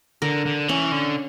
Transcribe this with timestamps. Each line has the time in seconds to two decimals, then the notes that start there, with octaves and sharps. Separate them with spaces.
0.22 D3 A#4
0.46 D3
0.68 E3 C#4
0.92 D3